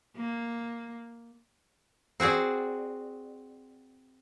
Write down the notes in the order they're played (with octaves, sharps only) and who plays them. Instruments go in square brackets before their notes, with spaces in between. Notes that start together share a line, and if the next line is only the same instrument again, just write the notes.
[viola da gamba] A#3
[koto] C4 F#4 G#4 D5